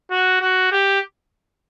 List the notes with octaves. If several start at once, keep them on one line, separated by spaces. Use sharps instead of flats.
F#4
F#4
G4